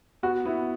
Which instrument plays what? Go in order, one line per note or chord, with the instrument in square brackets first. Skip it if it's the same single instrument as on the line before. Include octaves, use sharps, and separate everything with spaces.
[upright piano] B3 [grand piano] F#4
[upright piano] B3 [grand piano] E4